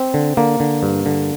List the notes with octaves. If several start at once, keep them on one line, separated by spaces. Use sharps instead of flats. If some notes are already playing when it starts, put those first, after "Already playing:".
Already playing: C4
D3
D3 A#3
D3
G2
D3